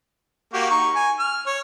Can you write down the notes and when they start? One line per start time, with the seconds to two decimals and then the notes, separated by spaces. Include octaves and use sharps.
0.53 A#3 F#4 G4
0.70 D#4 C#6
0.95 G#5
1.19 F6
1.46 C#5